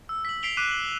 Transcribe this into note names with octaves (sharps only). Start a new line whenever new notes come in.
E6
B6 F#7
B6 C7 D7 F7 G7
D6 F#6 B6 C7 D#7 E7
F#7